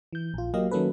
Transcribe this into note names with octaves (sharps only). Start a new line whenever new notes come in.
E3 G6
A#1 F4
F#3 A#3 G4 D#5 F5
D#3 F#3 A#3 C#4 A4 B4